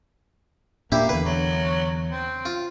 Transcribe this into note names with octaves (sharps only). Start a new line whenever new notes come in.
A#2 A#3 D4 E4 G4
E2 D3 B4
F#3
C4
F4